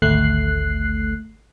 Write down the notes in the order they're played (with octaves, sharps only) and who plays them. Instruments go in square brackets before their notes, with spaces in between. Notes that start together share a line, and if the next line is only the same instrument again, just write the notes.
[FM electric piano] G#1 D2 A3 F#6 C7